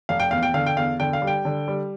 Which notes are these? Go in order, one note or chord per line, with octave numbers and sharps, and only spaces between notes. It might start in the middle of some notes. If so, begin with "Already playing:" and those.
F1 F5
G5
E2 F5
G5
D3 F5
G5
E2 F5
D3 G5
F5
G3
G5
D3
G3